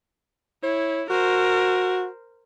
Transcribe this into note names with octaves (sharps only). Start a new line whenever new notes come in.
E4 C#5
F#4 A#4 C5